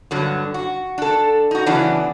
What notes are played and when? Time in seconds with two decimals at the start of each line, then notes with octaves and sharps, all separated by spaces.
0.11 G2 D3 F#3
0.54 F#4
0.98 D4 A4
1.51 D#4 F#4
1.66 C#3 E3 F#3 B3 D4